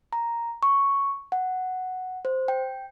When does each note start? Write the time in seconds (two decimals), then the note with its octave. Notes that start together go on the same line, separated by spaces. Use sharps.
0.13 A#5
0.63 C#6
1.32 F#5
2.25 C5
2.48 G5